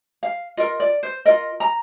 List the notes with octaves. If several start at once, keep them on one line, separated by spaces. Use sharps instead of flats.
F5
F4 A#4 D#5
D5
C5
F4 A#4 D#5
A#5